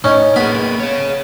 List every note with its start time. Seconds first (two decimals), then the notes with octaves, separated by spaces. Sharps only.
0.04 A2 C#4 D#4
0.36 A#3 B3 G#4 B5
0.80 G#4 C#5